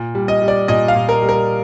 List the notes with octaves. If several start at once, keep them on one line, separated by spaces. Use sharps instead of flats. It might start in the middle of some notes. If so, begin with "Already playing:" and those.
Already playing: A#2
G3
D#5
G3
D5
A#2 D#5
F5
A#2
A#4
G3
A#4